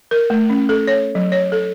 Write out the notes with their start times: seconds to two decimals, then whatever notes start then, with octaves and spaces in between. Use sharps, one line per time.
0.11 A#4
0.30 A3
0.50 C#4
0.69 A4
0.87 C#5
1.15 F#3
1.32 C#5
1.52 A4